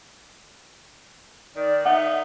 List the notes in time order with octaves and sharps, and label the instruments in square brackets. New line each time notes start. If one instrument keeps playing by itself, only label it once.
[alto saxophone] D#3 [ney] D5
[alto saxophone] D#4 [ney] E5 [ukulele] F#5